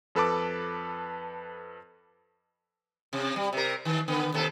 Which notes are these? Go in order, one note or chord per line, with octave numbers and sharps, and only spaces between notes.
F2 A4 B4 A5 D6
C3
G3
C3 A#4
D#3
D3 B3
D#2 C3 A4